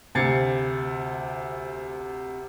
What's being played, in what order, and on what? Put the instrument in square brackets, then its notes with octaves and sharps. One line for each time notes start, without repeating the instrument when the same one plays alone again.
[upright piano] D2 C3 G#6 A6 C7 C#7